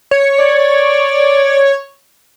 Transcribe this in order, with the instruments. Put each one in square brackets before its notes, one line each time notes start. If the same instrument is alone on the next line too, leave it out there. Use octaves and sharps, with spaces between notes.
[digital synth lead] C#5
[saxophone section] D5